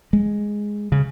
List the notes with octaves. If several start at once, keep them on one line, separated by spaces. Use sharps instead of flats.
G#3
C#3